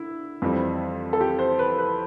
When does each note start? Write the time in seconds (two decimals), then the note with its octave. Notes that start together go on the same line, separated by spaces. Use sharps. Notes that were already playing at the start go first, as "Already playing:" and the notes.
Already playing: D3 E4
0.42 F2 E3 G3 C4
1.13 A4
1.21 G4
1.39 C5
1.59 B4
1.78 B4